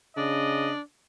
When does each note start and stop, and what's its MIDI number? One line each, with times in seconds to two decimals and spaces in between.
0.17 0.72 49
0.17 0.81 62
0.17 0.74 75